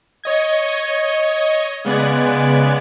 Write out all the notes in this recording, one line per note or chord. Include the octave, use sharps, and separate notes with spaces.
C#5 D#5 G#6
C#3 G#3 B3 D5 F#6 G#6